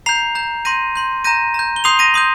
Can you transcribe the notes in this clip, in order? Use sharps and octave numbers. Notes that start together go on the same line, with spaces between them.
A#5 G6 C7 F7
A#5 G6
C6 G6 A#6 D#7
C6 G6
A#5 G6 A#6 D#7
A#5 G6
G7
C6 D#6 G6 C7 F7
A#6 D#7
C6 D#6 G6